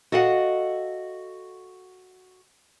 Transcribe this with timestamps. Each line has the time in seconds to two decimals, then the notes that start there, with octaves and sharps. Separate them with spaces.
0.12 F#4 A4 D#5 F5 F#5